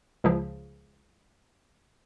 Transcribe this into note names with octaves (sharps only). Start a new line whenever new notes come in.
C#2 C#3 F3